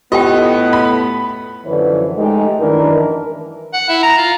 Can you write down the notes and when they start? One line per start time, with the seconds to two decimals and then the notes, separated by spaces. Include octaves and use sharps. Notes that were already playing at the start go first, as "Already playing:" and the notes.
0.12 A2 A3 B3 F4 G4 D#5 G5
0.73 B5
1.65 F#2 D3 E3 F3 B4 C#5
2.17 G#3 A3 D#4 G4
2.59 F#2 D#3 E3 D4 A#4
3.74 F#5
3.89 E4
4.03 A#5
4.18 F4